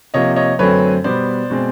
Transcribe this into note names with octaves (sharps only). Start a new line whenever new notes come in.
C3 F3 A#3 C#5 D#5
C#5 D#5
F#2 D3 F#3 A3 C4 B4 C#5
B2 G3 B3 C5 D5
B2 G#3 C4